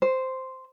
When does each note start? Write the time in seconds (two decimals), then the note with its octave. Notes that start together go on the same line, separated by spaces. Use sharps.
0.02 C5